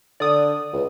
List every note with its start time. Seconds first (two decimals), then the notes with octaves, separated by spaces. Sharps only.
0.20 D3 D5 D#6
0.73 C#2